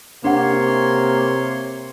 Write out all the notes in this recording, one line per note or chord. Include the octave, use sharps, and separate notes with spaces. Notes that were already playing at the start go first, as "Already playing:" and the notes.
C3 A#3 D4 C#5 F#5 C6